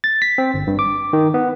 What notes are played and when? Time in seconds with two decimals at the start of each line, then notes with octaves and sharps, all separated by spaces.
0.04 A6
0.22 B6
0.38 C4
0.54 G1
0.67 G2
0.79 D6
1.13 D#3
1.34 B3